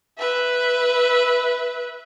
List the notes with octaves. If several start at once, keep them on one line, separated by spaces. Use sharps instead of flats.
B4 E5